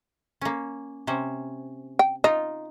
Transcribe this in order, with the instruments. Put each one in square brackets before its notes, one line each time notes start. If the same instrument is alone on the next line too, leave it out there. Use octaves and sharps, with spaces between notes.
[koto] A#3 C#4
C3 C#4 C5
[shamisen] G5
[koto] D#4 F4 [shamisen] D#5